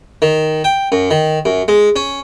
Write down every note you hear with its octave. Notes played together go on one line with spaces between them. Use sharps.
D#3
G5
F#2
D#3
F#2
G#3
C#4